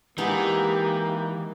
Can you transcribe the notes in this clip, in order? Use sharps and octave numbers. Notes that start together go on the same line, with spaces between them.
E3 G#3 A#3 B3 D#4 G4